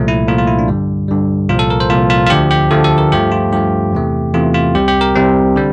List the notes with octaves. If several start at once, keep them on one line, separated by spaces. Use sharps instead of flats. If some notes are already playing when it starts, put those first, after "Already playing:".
Already playing: C2 A#2 F3 A3
E4
C2 A#2 F3 A3 F4
F4
E4
D4
G2 D3 G3
G2 D3 G3
C2 A#2 F3 F4
A4
A#4
C5
C2 A#2 F3 F4
F4
F4
D2 D3 F3 A3 G4
G4
D2 D3 F3 A3 A4
A4
A#4
G2 F3 A3 G4
F4
G2 F3 A3 G4
E2 C3 E3 A3
E2 C3 E3 A3 F4
F4
C2 C3 G3 G4
G4
A#4
C2 C3 G3 C4
D3 G3